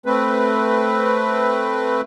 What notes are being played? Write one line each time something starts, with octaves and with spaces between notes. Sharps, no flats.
A3 C4 B4